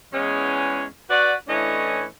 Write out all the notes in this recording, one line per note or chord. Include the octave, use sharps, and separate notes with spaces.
E2 G#3 C#4
F#4 B4 D5
A2 E3 A3 C#4 D4 D#5